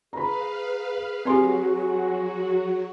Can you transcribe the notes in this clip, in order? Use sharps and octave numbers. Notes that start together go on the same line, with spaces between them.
G#4 B4 F5 A#5 B5
F#3 C4 F#4 G4 G#5 C6